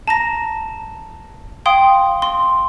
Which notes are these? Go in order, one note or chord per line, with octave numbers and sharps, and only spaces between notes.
A5 A#5 A#6
F5 G5 C6 D#6
C6